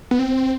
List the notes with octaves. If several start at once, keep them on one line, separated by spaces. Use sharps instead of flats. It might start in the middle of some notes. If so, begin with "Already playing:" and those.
B3
C4